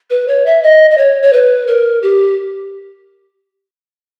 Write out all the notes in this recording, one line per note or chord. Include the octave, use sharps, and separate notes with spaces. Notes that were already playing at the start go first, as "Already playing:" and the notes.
B4
C#5
E5
D#5
D#5
C#5
C#5
B4
A#4
G4